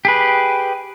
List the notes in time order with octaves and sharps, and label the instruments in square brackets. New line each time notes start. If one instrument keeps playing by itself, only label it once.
[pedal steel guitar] G4 G#4 B4